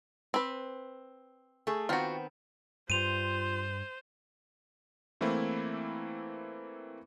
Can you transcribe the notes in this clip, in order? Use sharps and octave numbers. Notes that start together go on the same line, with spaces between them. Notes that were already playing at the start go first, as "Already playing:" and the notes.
C4 B4
A3 G#4
D#3 B3 C4 F4 F#4
G2 G3 F4 C5 D#7 F7
E3 A3 A#3 C4 E4